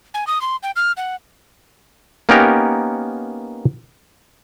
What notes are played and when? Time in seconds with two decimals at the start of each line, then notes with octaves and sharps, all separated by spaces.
0.14 G#5
0.27 D#6
0.41 C6
0.63 G5
0.76 F6
0.97 F#5
2.29 A#3 B3 C#4 D#4 G4 A#4